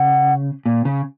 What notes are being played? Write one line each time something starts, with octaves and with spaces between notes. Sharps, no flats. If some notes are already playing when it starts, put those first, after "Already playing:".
Already playing: C#3 F#5
A#2
C#3